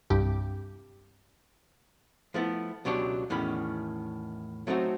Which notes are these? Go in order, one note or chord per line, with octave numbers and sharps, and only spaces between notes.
C2 G2 G4
F3 A3 B3 E4
C#2 B2 F#3 D4 G4 C#5
E2 A2 D#3 C#4 B5
F#3 A3 C4 D#4 F#4